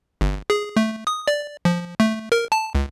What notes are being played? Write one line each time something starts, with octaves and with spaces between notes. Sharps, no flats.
G1
G#4
A3
D#6
D5
F3
A3
A#4
A5
C#2